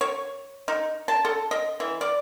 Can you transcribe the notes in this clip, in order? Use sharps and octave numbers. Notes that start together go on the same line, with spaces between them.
C#5
D#4
A5
A4
D#5
E3
D5